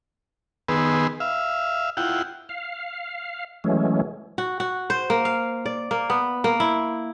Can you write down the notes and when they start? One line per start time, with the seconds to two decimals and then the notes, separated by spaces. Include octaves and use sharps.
0.69 D#3 B3 G#4 B4 C6 E6
1.20 E5 F5
1.97 E4 F4 F#5 G5
2.49 F5
3.64 E3 F#3 G#3 A3 C#4
4.38 F#4
4.60 F#4
4.90 C5
5.10 A#3
5.25 F5
5.66 D5
5.91 A#3
6.10 B3
6.44 A#3
6.60 E4